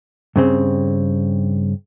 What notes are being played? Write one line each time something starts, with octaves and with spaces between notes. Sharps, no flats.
G2 C#3 C4